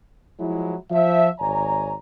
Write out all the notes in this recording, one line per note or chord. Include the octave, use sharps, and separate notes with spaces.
F3 F#3 G#3 E4
F3 E5
G#1 C#5 D5 G#5 A#5